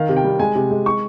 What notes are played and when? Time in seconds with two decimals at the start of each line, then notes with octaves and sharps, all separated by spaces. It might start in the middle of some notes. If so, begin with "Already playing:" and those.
Already playing: D#3 F5
0.09 C3
0.16 G5
0.24 G3
0.39 G#3 G#5
0.55 C3
0.71 G#3
0.86 C#6